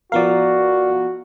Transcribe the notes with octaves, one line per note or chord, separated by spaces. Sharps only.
F3 B3 F#4 A#4 D5 F5